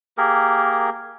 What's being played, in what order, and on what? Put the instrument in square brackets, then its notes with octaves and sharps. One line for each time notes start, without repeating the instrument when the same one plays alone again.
[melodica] A#3 G4 G#4 A#4